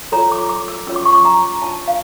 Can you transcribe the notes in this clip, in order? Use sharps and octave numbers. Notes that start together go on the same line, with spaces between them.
F4 A4 C#5 A#5
D6
D6
E6
C#4 F4 C#5 E6
D6
C#6
D6
A#5
D4 F4 C#5 A5
F5